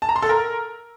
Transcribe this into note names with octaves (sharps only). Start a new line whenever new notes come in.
A5
A#5
C6
A4
A#4